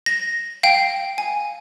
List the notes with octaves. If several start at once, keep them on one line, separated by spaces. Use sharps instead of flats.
A#6
F5 G5
G#5